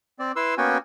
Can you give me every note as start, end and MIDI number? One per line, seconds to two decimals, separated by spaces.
0.19 0.32 60
0.19 0.32 74
0.36 0.55 64
0.36 0.55 71
0.36 0.55 84
0.36 0.55 88
0.58 0.78 58
0.58 0.78 59
0.58 0.78 61
0.58 0.78 66
0.58 0.78 79
0.58 0.78 80